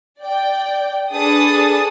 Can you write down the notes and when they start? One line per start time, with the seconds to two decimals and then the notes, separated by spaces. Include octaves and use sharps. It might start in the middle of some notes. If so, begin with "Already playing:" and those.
0.22 D5 G5
1.12 D4 G#4 A4 B4 D#6 A6